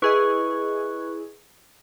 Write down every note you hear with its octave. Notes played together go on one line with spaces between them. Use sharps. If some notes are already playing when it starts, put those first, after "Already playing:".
E4 G#4 B4 D#5 C#6